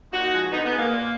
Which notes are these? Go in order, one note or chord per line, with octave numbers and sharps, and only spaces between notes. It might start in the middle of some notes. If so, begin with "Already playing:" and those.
A#2 D#4 F#4
F3 G#3
D3 B3 D#4
B3
G#3
A#3
A#2